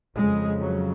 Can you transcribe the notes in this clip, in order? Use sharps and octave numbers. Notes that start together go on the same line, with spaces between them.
F2 C#3 G#3
F#3